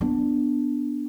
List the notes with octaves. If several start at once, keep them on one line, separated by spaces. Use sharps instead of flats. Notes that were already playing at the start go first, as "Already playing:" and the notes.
B3 D4